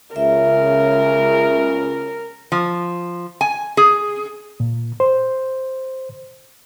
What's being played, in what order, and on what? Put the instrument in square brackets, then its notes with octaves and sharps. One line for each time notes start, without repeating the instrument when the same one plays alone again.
[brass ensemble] C#2 C#3 [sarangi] A#4 [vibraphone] E5
[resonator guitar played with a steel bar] F3
G#5
G#4
[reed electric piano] A#2
C5